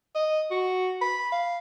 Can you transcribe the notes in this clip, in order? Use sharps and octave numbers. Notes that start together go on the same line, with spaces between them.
D#5
F#4
B5
F5